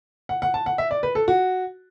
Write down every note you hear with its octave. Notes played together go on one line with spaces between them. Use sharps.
F#5
F#5
A5
F#5
E5
D5
B4
A4
F#4